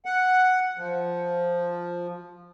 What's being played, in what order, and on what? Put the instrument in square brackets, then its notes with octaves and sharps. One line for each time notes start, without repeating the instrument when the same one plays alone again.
[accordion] F#5
F3